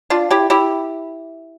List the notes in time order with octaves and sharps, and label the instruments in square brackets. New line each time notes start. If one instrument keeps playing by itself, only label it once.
[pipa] D4 F4
E4 G4
E4 G4